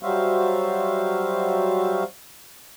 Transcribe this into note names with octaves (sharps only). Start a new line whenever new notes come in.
F#3 G3 F#4 C5 E5 F5